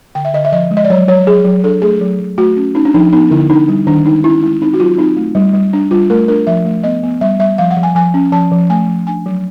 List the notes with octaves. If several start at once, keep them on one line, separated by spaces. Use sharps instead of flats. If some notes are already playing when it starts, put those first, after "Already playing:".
D3 G5
E5
D3 D#5
E5
F3 D#5
G#3
D#5
D5
F#3 C#5
F#3 C#5
F#3 G#4
F#3
D4 A4
A3 G#4
F#3
F#3
A3 F#4
C#4
C#4 D#4
D4
F3 D#4
B3 D#4
D3 E4
D4 D#4
G3
D#3 D4
G#3 D#4
C#4 E4
G#3 E4
C4 D#4
F#4
F#3 F4
C4 D#4
A3
G3
G3
D4
G3 F4
A3 A#4
D4 A#4
F3 E5
A3
B3 D#5
B3
G3 E5
G3 E5
F3 F5
F#5
F3
G#5
F3 G#5
C#4
F3 A5
F3
A3 G#5
F3
D4 G#5
F#3